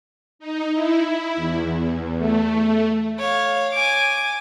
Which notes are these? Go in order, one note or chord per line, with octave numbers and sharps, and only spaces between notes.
D#4
E4
E2
A3
C#5 F5
G#5 D6